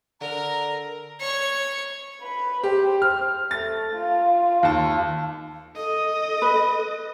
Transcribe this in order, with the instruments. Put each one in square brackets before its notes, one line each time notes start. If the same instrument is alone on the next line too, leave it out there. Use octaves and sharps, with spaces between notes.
[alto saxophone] D3 [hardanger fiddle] A#4 [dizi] A#5
[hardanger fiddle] C#5 C#6
[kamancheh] B4 B5
[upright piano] G4 [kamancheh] C5
[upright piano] F6
[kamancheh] A3 [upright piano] A6
[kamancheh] F4 F5
[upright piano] D#2 A5
[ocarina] A4 [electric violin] D#5
[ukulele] B4